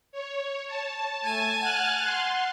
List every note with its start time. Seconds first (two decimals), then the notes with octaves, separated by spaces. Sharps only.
0.12 C#5
0.67 A5
1.25 A3 G#5
1.63 F#5 F6 F#6 A6
2.03 C6